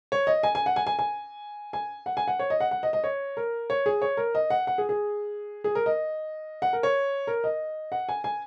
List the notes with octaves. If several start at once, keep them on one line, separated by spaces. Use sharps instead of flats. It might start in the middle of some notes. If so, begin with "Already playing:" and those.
C#5
D#5
G#5
G#5
F#5
G#5
G#5
G#5
G#5
F#5
G#5
F#5
C#5
D#5
F#5
F#5
D#5
D#5
C#5
A#4
C#5
G#4
C#5
A#4
D#5
F#5
F#5
G#4
G#4
G#4
A#4
D#5
F#5
A#4
C#5
A#4
D#5
F#5
G#5
G#5